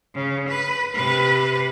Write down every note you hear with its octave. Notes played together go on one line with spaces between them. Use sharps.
C#3
B4
C3 B4